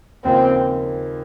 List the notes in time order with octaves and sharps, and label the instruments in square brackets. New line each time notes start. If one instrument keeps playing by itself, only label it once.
[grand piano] D#2 C#3 F3 A#3 [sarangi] C4